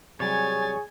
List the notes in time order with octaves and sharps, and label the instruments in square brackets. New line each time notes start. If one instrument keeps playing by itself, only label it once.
[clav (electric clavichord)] C3 F#3 G3 [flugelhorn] G#4 [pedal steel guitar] C#5 [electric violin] G#5 A6